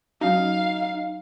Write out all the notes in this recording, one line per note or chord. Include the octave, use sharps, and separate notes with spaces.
F#3 C#4 D#4 F#4 F5